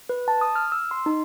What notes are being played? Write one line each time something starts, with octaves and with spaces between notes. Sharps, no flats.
B4
A5
D#6
F6
E6
C6
D#4